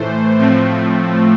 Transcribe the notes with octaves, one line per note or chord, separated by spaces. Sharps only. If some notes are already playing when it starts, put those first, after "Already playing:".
Already playing: A2 E3 A3 C5
A2 F3 A3 C4